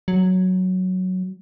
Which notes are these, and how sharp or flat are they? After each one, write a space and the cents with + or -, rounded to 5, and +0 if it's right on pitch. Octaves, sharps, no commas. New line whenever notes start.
F#3 +0